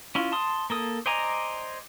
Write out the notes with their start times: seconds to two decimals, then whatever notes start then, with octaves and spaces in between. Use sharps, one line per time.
0.15 C#4 E4 F4
0.32 A5 C6 D#6
0.70 A#3 A4 D#6
1.06 C5 D5 D#5 G#5 A#5